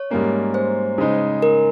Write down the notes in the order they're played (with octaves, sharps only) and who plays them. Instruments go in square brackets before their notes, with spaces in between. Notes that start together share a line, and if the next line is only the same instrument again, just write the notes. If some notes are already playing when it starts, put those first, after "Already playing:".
Already playing: [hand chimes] C#5
[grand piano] G#2 G3 A#3 C#4
[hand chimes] C5
[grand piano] C#3 G#3 D#4
[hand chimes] A#4